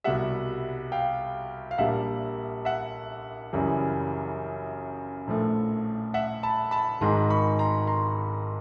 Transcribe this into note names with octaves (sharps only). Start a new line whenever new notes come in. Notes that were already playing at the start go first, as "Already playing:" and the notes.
C2 B2 G3 E5 F#5
F5 G5
F5
A#1 A#2 G3 A#3 E5 F#5
E5 F#5
F#1 F#2 C#3 E3 G3
A#1 A2 F3 A3
E5 F#5
A5 B5
A5 B5
G#1 G#2 D#3 G#3 A#5 C6
B5 C#6
A#5 C6
A#5 C6